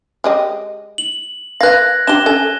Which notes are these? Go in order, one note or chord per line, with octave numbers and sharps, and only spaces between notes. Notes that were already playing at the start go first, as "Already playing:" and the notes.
G#3 G4 D#5
F#7
B4 F5 F#6 G#6 A#6
D4 G4 E7 G7
C#4 A4 G#5